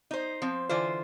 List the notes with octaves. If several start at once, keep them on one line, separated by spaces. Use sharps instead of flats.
D#4 C5
F3 C4
D3 E3 F4 C5